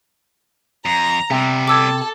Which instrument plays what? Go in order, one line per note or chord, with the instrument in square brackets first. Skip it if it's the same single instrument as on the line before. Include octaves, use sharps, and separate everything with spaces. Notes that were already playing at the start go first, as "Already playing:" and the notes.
[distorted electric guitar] F2 [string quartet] A#5
[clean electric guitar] C3 [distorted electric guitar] G3 B3
[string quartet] A4 [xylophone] D6 E6 G#6